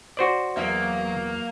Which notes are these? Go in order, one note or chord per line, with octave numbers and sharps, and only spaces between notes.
F#4 C5 D5
E2 F#3 A#3 E5